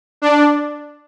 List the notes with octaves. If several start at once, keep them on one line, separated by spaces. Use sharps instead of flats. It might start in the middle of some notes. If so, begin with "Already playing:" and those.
D4